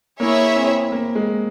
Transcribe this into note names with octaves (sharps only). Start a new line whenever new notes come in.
A#3 E4 G#4 C#5 E5
C4
A#3
G#3